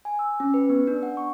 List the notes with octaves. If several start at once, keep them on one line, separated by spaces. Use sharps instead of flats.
G#5
E6
C#4
B4
B3
D4
F#5
C#6